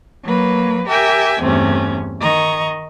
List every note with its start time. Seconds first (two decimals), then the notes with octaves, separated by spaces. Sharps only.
0.24 F#3 A#3 B4
0.87 G4 A#4 E5 G5 G#5
1.40 E2 G2 C3 A3 C#4
2.20 D#3 D#5 A#5 C#6